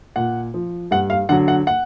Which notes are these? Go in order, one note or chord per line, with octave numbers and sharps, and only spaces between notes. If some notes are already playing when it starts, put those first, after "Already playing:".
A#2 F#5
F3
G2 F#5
F5
D3 F#3 F#5
F#5
F#5